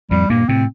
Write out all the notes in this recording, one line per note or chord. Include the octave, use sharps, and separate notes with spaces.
F2 A2 G3
G2 A#2 A#3
A2 C3 C4